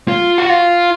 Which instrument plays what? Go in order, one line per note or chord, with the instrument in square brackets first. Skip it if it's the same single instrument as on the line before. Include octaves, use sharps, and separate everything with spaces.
[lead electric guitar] F4
F#4
F4